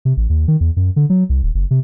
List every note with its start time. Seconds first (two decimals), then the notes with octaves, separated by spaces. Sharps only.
0.05 C3
0.17 A1
0.30 D#2
0.48 D#3
0.60 E2
0.76 F#2
0.96 D3
1.10 F#3
1.29 C2
1.43 D#1
1.54 F#1
1.71 C3